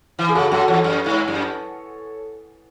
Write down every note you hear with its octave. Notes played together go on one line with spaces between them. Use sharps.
E3
G#4
C#3 F#4 A4
F#2 F#4 A4
E2 A4 C#5
F#2
G#2
F#2